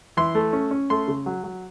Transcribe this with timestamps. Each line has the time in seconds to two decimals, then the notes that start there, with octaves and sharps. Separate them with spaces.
0.17 E3 C6
0.35 A3
0.53 C#4
0.71 C#4
0.90 A3 C6
1.08 C#3
1.26 F#3
1.44 F#3